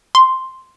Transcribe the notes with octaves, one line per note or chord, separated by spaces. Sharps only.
C6